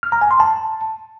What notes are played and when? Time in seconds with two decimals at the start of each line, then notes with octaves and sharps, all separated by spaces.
0.03 F6
0.12 A#5
0.21 G#5
0.31 C6
0.40 A5